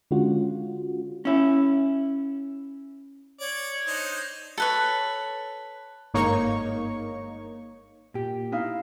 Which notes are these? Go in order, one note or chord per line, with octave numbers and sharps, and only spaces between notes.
D3 G#3 C#4 F4 F#4
C#4 E4
C#5 D5
D4 D#4 C5
A4 B4 C#5
G1 G#2 A#3 D#4 C#5 C#6
A#2 G4
D#4 E4 F5